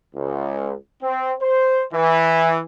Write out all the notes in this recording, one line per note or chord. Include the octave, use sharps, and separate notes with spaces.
C#2
C4
C5
E3